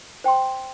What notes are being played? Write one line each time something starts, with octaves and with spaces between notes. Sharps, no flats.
C5 G5 C6